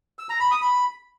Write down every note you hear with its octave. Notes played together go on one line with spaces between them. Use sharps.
E6
A#5
B5
D#6
B5